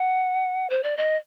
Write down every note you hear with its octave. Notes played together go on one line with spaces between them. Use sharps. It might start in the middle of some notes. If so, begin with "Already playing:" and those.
Already playing: F#5
C5
D5
D#5